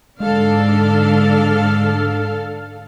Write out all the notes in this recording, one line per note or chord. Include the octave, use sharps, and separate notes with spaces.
G#2 D3 G#3 D4 A4 F5